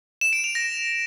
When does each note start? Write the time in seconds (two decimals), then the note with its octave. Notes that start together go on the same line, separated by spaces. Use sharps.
0.21 E7
0.33 D7
0.44 F7
0.55 A#6